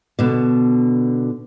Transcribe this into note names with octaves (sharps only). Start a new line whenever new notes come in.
B2 D3